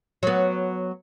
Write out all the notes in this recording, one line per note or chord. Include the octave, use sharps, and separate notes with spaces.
F#3 B3